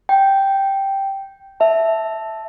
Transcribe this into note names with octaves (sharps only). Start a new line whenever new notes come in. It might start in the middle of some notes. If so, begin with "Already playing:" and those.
G5
E5 A5